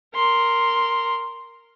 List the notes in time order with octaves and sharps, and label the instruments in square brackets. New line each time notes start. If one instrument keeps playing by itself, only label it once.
[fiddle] A#4 C6